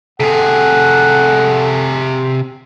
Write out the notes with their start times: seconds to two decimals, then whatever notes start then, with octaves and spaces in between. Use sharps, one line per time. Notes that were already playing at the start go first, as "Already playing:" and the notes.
0.20 C3 G#4 A4 F#5